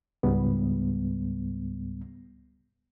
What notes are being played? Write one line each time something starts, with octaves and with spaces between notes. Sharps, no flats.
C#2 G#2 G3 B3